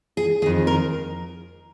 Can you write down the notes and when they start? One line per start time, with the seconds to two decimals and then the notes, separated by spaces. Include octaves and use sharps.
0.17 G#4
0.42 D#3 G#4
0.46 F2
0.67 A#4